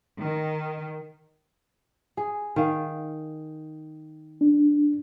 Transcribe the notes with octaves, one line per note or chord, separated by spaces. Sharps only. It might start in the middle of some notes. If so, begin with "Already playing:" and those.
D#3
G#4
D#3 F5
D4